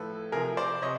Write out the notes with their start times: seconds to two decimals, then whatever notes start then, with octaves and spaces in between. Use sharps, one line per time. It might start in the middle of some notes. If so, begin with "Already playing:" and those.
Already playing: A2 F3 A4 B4
0.32 C3 G#4 A#4
0.35 F3
0.57 C5 D5
0.82 C3 C#5 D#5